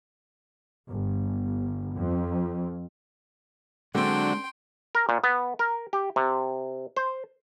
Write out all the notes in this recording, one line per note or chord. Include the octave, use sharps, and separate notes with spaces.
G1
F2
D3 F#3 G#3 C4 D4 F#4 G5 C6
A#4
A#2
B3
A#4
G4
C3
C5